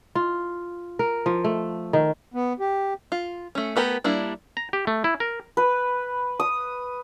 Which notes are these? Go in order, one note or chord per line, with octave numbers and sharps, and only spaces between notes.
F4
A#4
F3
A3
D#3
B3
G4
F4
A3 C#4
A3 B3 G4 A#4
G3 A#3 D4 E4
A#5
G4
A3
E4
A#4
B4
D#6